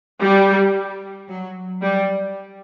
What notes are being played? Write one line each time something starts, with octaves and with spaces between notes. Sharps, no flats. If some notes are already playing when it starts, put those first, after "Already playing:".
G3
F#3
G3